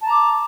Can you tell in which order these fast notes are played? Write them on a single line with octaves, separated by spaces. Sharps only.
A5 A#5 D6